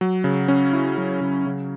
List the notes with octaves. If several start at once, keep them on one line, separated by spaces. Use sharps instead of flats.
F#3
C#3
C#4
E4
F#3
C#3
C#3